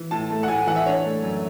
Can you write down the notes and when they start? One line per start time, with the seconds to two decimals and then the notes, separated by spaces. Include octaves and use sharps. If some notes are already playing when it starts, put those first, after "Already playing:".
Already playing: E3
0.11 A2 A5
0.31 A3
0.43 F#5
0.48 A2 G#5
0.67 E3 F#5
0.76 E5
0.86 D4 C#5
1.05 A3
1.23 F#2